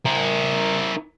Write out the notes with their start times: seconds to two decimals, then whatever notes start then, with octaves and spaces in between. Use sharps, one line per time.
0.05 E4 A#4